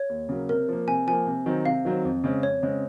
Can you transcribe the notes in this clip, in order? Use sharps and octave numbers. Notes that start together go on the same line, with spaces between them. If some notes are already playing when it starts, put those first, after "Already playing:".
Already playing: C#5
D#2
C#3 F#3 A#3
C3 A#4
F3 A#3
C3 G#5
F3 A#3 G#5
C3
D#3 F#3 C4
C3 F5
D#3 F#3 C4
F2
C#3 G#3 C4
F2 C#5
C#3 G#3 C4